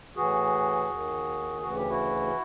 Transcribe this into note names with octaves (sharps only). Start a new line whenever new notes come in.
A2 E3 F#4 G#4
D#2 D#3
D2 C#3 E3 F#4
G4
E4 F#4